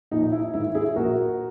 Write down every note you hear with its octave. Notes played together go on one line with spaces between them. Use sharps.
A#1 D#4
E4
G#2 D#3 E4
E4 G#4
A#1 F#4 A#4